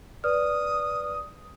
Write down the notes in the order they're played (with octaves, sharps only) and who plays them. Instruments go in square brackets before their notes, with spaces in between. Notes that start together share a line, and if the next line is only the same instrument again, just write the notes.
[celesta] B4 D5 F6 [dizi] D#6